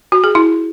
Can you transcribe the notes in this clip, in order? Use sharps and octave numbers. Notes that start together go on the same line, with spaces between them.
F#4
G#4
E4